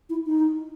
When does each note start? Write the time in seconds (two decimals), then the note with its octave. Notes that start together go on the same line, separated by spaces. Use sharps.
0.10 E4
0.27 D#4